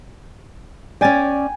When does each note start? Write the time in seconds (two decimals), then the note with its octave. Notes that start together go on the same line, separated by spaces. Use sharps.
1.01 C#4 D5 G5 G#5 A6